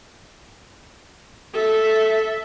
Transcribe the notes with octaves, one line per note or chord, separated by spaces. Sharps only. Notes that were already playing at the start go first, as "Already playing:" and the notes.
A4 E5